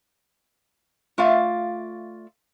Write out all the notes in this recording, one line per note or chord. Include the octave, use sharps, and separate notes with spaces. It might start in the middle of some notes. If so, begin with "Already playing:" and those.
A3 F4 D5 E5 F5